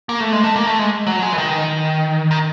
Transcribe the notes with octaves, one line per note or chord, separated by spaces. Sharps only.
A#3
A3
G#3
A3
A#3
A3
G#3
F#3
G#3
E3
D#3
D#3